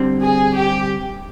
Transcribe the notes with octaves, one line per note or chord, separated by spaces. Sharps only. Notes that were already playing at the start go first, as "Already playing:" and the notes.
Already playing: D3 G3 C4
G#4
G4